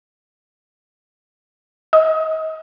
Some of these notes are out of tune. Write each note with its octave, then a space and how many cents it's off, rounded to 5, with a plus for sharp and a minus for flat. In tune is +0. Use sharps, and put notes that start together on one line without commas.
D#5 +40